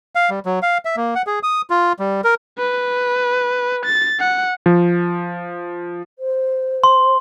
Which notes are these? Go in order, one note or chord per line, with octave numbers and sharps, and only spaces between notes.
F5
G3
F#3
F5
E5
A#3
F#5
G#4
D#6
F4
G3
A#4
B4
A6
F#5
F3
C5
C6